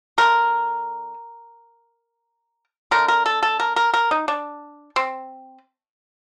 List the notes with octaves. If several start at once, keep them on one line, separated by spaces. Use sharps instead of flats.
D3 A3 A#4
D3 A3 A#4
A#4
A4
A4
A#4
A#4
A#4
D#4
D4
C4